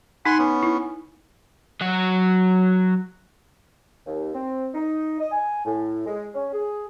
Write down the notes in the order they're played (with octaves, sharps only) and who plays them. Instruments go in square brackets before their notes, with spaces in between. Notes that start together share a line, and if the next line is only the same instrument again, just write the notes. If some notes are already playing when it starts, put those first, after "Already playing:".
[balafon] D#4 [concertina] F#5 G#5 C6
[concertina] B3 C#4
[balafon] E4
[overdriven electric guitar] F#3 F#4
[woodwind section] D#2
C4
D#4
D#5
G#5
A2
G#3
C#4
G#4